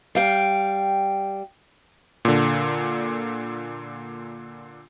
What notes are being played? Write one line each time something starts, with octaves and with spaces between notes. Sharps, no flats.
G3 F5 G5
A#2 D3